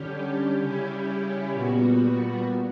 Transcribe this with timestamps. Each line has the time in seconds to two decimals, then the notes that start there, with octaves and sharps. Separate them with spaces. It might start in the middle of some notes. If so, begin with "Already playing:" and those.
Already playing: D3 G3 C#4 G4
0.59 C#3 G3 C#4 E4 G4
1.51 A#2 G3 B3 F#4